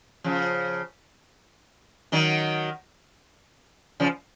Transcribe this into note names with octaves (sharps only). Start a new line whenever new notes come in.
C#3 F3
D#3 F#3
C#3 F3